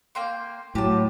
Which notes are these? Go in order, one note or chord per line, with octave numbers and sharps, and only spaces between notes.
A#3 G5 C6
A2 F#3 G4 A5